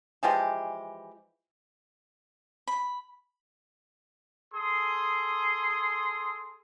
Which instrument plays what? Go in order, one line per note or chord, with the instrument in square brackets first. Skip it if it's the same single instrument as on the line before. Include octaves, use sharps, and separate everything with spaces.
[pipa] E3 F3 G#3 G4
[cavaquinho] B5
[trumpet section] G#4 A4 C6 D#6